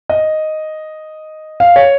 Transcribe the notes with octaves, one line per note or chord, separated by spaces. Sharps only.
D#5
F5
C#5